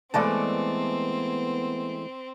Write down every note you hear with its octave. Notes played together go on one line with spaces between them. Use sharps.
E3 G#3 A3 B3 C4 A4 D5 A5